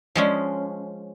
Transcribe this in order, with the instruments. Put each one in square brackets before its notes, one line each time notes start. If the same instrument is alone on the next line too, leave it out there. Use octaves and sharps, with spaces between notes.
[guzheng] F3 G#3 C#4